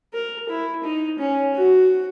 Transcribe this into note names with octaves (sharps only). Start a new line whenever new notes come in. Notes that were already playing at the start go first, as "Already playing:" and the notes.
A#4
E4
D#4
C#4
F#4